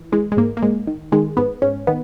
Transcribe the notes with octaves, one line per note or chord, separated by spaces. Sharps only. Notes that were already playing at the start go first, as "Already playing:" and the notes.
Already playing: E3
E3 G#3
G#3
G#2 A#3
A#3
G#2 G#3
D#3
D#3 G#3
G#2 B3
G#2 C#4
D#3 B3